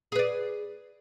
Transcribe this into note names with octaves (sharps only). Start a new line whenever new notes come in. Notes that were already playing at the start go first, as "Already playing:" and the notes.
G#4 B4 D5